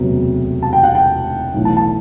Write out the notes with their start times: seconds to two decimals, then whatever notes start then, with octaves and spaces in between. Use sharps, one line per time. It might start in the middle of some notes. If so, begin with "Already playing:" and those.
Already playing: E1 D2 C3 F#3 B3
0.62 A5
0.73 G5
0.83 F#5
0.95 G5
1.53 B1 A2 E3
1.65 A5
1.77 A5